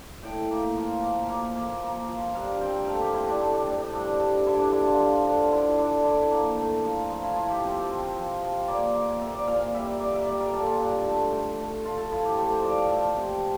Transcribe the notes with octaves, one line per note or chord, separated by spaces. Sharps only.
A2 G5
A#3
F3
A#3
A#3 F5
A#3
A#3
F3
G2 F5
C4 G5
A3 F5
G4
C4 E4
D4
A3 E4
D4
A3 D4
D4
G2
G2
D3 E4
D4
D3 E4
F4
F3
D3
D3 E4
D3 D4
D3 E4
A#3
A3
F3
F3 F4
E4
F3 F4
G4
C4
C4
F3
F3
A#3 D5
A#3
A#3 E5
D5
A#2 F5
F5
G3 E5
E5
A#3 D5
E5
G3 D5
A#4
A#2 A4
F4
G2
A3
A3
A3
A3 F4
A4
F3 E4
G4
A3 A4
C5
F3 D5
F5
F3 E5
C3